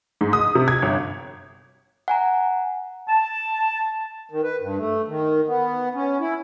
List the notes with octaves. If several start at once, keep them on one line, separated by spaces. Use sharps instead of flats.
G#2
D#6
C3
G#6
G1
F#5 G#5 A#5
A5
D#3
B4
G2
A3
D#3
B3
C#4
E4